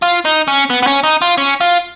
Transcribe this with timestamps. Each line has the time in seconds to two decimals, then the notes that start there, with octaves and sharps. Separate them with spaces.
0.02 F4
0.25 D#4
0.48 C#4
0.70 B3
0.82 B3
0.87 C#4
1.03 D#4
1.22 F4
1.38 C#4
1.61 F4